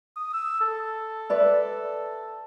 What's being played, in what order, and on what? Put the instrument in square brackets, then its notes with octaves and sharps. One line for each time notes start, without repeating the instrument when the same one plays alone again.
[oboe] D#6
E6
A4
[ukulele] B4 D5 E5